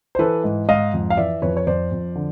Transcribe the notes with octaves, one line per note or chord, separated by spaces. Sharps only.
C5
E3 A4 B4
G#2
G#2 D#5 F5
F2
F5
E3 D5 E5
F2 B4 C#5
C#5
F2 C5 D5
F2
D3